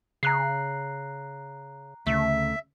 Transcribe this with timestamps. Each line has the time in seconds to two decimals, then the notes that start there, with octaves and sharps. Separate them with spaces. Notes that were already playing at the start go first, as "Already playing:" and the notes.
0.23 C#3 A#5 F#6 C7
2.07 D2 C#3 A3 E5